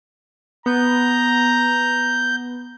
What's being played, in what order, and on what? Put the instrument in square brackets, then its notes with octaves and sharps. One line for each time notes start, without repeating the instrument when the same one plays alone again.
[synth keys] B3 [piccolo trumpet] A#5 [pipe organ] G6